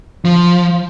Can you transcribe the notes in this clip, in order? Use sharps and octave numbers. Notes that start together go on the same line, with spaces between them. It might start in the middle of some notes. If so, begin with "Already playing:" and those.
F3